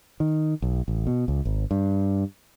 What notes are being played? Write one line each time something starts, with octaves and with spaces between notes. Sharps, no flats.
D#3
B1
A1
B2
C#2
G#1
G2